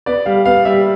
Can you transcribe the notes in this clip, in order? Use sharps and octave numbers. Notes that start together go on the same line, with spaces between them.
B3 D5
G3 F5
B3 F5
G3 E5